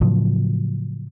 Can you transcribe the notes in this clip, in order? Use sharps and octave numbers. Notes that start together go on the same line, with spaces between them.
A2 C#3 F3 F#3